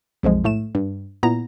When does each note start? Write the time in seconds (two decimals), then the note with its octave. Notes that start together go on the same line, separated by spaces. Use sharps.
0.23 B1 F2 F3 G#3
0.44 A2 A3 E7
0.75 G2
1.23 A#2 B3 E4 A#5 A#6